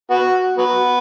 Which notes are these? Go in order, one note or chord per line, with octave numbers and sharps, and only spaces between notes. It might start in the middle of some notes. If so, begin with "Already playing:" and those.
B3 F#4
F#3 B3